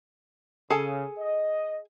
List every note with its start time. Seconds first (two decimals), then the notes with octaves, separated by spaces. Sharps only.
0.70 C#3 G#4 A4 G#5
1.19 D#5